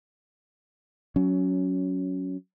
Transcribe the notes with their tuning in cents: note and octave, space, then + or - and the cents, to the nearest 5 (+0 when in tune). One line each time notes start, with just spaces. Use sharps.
F#3 +0 C#4 +15